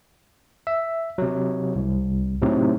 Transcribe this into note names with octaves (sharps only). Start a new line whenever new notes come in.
E5
C3 F#3
C2
A2 C3 F#3 C4 D#4